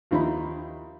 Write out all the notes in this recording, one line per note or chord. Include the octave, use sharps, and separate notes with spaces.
D#2 F3 D#4 E4 D#5 B5